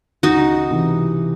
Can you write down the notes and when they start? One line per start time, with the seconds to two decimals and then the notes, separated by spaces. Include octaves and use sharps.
0.23 C#2 D#4 F#4
0.71 C3 E3